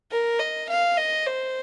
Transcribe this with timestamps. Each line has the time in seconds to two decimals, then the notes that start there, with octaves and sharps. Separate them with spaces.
0.12 A#4
0.39 D#5
0.69 F5
0.97 D#5
1.27 C5